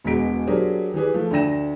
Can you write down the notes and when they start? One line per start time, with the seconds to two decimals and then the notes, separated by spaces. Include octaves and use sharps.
0.05 E1 B2 G#3 F#4 B6 D7
0.47 F#3 D4 G4 G#4 A#4 C5
0.94 E3 G4 G#4 B4
1.14 F3 A3
1.31 D2 D4 G5 A#6 E7